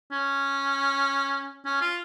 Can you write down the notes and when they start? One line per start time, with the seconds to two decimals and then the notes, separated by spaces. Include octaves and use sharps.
0.12 C#4
1.65 C#4
1.81 F4